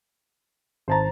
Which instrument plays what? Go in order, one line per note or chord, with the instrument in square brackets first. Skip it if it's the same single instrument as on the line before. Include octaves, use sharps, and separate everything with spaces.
[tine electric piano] G#1 A6 [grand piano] C5 A5 A#5